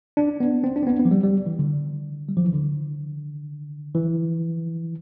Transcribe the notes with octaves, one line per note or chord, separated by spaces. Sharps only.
D4
B3
C4
D4
C4
B3
B3
F3
G3
G3
E3
D3
G3
F3
E3
D3
E3